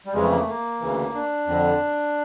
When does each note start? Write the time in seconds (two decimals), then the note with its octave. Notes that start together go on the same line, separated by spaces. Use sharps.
0.06 G3
0.13 F2 C#3 E3 G#3
0.22 A3
0.30 A#3
0.38 A3
0.48 A#3
0.80 D2 C#3 E3
1.14 D4
1.47 F2 D3